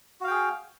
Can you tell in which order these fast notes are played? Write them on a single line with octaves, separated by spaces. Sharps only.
F#4 F5 G5 G#4